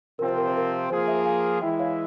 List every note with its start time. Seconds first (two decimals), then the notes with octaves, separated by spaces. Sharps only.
0.19 C3 F3 C4 F4 A#4
0.29 C5
0.38 A#4
0.48 C5
0.57 A#4
0.90 F3 A#3 F4 G#4 C5
1.08 C5 E5
1.25 F5 G#5
1.61 E3 G#3 E4 E5 G5
1.79 C#5 F5